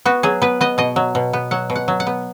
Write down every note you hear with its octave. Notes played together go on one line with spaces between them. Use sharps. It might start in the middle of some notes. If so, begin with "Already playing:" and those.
B3 F#4
F#3 G#4
B3 B4
B3 D#5
B2 D#5
F#3
B2
B3
F#3 F#5
B2
F#5
F#3
F#5
B3